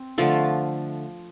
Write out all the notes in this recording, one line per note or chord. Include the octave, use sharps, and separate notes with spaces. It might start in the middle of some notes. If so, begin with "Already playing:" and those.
Already playing: C4
D3 F3 A3 F4